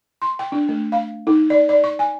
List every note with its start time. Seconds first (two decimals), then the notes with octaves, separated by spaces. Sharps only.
0.22 C6
0.39 G5
0.52 D4
0.69 A3
0.92 F5
1.27 D#4
1.50 D5
1.69 D5
1.84 C#6
1.99 G#5